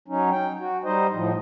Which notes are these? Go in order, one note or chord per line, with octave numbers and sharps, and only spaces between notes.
F#3 C#4 D#4
G5
F#4
G3 D#4 C5 D#5
A2 F3